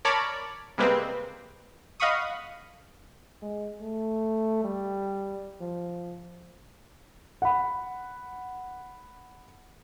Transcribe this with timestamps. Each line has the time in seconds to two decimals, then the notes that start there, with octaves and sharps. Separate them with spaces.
0.05 A#4 C#5 D5 A5 B5 D6
0.78 C3 G3 G#3 A#3 C4 B4
2.00 D#5 F5 F#5 B5 C#6 D#6
3.42 G#3
3.81 A3
4.64 G3
5.61 F3
7.42 F#5 B5